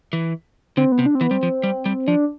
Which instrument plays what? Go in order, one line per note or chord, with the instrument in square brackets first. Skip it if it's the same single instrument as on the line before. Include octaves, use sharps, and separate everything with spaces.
[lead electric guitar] E3
[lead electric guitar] D3 [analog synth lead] C4
[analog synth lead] B3
[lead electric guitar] C3
[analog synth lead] D4
C4
[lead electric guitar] E3 [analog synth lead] B3
[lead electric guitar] G3 [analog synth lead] C4
[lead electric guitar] F3
G3
G3
[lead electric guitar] F3 [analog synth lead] D4